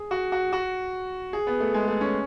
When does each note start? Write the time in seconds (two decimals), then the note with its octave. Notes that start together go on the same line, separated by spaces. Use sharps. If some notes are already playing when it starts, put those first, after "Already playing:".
Already playing: G#4
0.11 F#4
0.32 F#4
0.53 F#4
1.33 G#4
1.47 B3
1.60 A3
1.74 G#3
1.88 A3
2.01 C#4